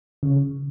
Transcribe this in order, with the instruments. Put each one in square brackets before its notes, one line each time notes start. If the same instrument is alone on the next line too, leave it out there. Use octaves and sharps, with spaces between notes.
[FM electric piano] C#3